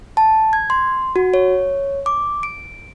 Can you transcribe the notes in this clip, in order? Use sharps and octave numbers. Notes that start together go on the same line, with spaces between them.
A5
G#6
C6
F#4
C#5
D6
D7